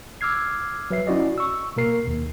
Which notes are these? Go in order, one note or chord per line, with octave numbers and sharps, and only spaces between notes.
D6 E6 F6 G#6 C7
F#3 B4 E5 C7
C#4 E4 F#4 D5 D#5
C#6 E6
B2 A#3 A#4 C7
D#2